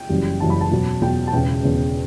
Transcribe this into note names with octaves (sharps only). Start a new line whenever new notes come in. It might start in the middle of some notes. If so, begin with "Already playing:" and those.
Already playing: G5
F#1 F#2 E3 G3
F#1 F#2 E3 G3 A5
B5
A5
E2 B2 F#3
E2 B2 F#3 G5
A5
E1 E2 C#3 G5
E1 E2 C#3